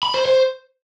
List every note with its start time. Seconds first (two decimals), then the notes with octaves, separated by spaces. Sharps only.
0.03 B5
0.14 C5
0.26 C5